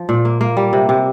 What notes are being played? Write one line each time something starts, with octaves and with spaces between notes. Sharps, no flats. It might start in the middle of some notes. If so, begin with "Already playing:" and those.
Already playing: F3
A#2
A#3
A#3
G3
C3
C3